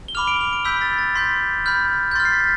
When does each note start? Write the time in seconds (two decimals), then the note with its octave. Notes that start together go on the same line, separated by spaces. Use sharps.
0.08 G7
0.15 B5 D6 F6 F7
0.27 D7
0.41 F7
0.53 D7
0.65 B5 E6 G6 B6
0.81 A6
0.99 A6
1.15 C6 G6 B6
1.66 B5 F6 G6
2.11 G6
2.15 C6 A6
2.20 F6
2.25 C7
2.32 B6